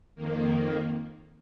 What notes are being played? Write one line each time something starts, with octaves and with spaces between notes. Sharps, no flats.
F2 D#3 A#3